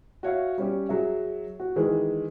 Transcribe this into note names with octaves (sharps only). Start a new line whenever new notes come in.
F#4 C#5 E5 F5
G3 C#4 G4
F#3 G#4 E5
F#4
D#3 E3 G#3